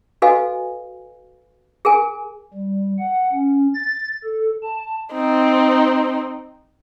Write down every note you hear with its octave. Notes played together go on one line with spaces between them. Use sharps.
F#4 A4 B4 D#5 F5 G#5
G#4 A#4 G#5
G3
F#5
C#4
A6
A4
A5
C4 D#4